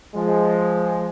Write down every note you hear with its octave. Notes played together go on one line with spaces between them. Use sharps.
F3 G#3